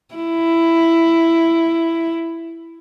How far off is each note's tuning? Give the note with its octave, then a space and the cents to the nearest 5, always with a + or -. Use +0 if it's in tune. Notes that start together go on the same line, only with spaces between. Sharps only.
E4 +10